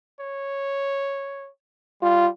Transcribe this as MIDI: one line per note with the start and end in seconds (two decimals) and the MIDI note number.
0.20 1.49 73
2.02 2.29 55
2.02 2.27 65